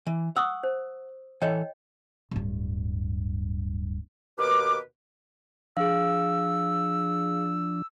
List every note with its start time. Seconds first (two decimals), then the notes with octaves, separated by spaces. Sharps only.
0.07 E3
0.36 F#5 C#6 D#6 E6
0.63 C5
1.42 E3 A4 C#5 D#5 G5
2.31 D1 G2
4.38 D#2 B2 B4 D6
5.77 F3 D4 G#4 F5 E6